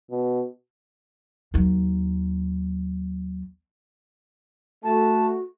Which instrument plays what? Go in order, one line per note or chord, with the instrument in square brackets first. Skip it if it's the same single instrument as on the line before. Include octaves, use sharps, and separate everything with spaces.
[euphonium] B2
[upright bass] D#2 F#3
[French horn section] A3 [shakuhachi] F#4 [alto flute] A5